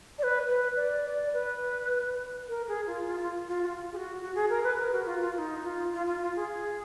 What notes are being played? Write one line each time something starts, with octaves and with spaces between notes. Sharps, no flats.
D5
B4
B4
D5
D5
B4
A#4
G#4
F4
F4
F4
F4
F#4
F4
G#4
F#4
F#4
G#4
A#4
B4
A#4
F#4
F4
F4
F4
D#4
F4
F4
F4
F4
G#4